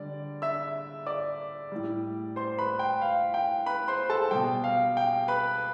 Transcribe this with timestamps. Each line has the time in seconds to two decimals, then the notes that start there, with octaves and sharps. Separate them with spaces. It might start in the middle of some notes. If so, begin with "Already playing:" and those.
Already playing: D3 G3 D5
0.42 E5 E6
1.06 D5 D6
1.72 A2 G3
2.36 C5 C6
2.58 B4 B5
2.79 G5
3.01 F5
3.34 G5
3.66 B4 B5
3.88 C5 C6
4.10 A4 A5
4.31 B2 G3 G5
4.64 F5
4.97 G5
5.28 B4 B5